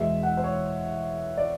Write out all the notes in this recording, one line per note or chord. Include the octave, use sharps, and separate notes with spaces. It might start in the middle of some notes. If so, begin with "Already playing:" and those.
Already playing: E2 B2 G#3 E5
F#5
C5
C#5
D5